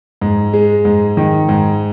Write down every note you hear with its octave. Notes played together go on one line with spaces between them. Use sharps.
G#2
G#3
G#2
D#3
G#2